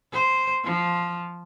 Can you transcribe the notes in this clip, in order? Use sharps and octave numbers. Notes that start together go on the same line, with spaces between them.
C5
F3